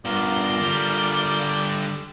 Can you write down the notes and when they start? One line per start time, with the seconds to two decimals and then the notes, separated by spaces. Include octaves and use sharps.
0.05 G2 B2 F4 A#4 D5 G7
0.60 D3 G3